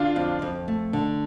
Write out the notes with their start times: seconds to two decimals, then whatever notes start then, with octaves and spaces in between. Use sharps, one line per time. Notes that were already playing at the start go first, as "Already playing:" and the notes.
Already playing: D3 D4 F4
0.16 F2
0.42 F2
0.68 A3
0.93 D3